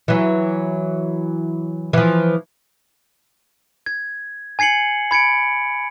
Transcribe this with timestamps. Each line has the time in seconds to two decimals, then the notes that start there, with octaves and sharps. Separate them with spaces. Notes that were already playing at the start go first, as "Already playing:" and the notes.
0.08 E3 F#3
1.93 E3 F3
3.86 G#6
4.59 G#5 G#6 C7 C#7 F#7
5.11 B5 G#6 C#7 D7